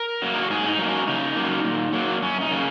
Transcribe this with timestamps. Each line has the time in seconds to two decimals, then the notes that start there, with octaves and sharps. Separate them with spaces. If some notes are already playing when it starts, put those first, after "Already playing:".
Already playing: A#4
0.22 F#3 A#3
0.34 D#4
0.43 F#4
0.50 G#2 G#4
0.64 C#4
0.69 D#4
0.79 F#3 A#3
0.88 C#4
1.07 C#3 D#4
1.36 F#3 A#3
1.65 A#2
1.93 F#3 A#3
2.22 F#2 C#4
2.41 D#4
2.51 C#3 A#3